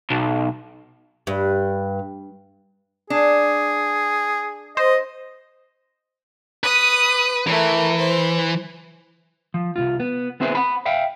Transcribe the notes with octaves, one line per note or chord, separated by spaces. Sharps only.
B1
G2
D4 G#4
C5 D#5
B4 D#6 D#7
E3 A3 A#4
C5
F3
C2 F2 F4
B3
B3 C4 E4 G#4 B4 C5
F#5 B5
E5 F5 G5